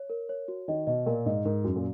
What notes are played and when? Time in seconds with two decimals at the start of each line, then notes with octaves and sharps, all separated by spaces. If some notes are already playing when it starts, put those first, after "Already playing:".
Already playing: C#5
0.10 A#4
0.29 C#5
0.48 F#4
0.68 D#3 D#5
0.87 B2 D#5
1.06 A#2 A#4
1.26 G#2 D#5
1.45 G#2 A#4
1.64 F#2 F#4
1.76 A#2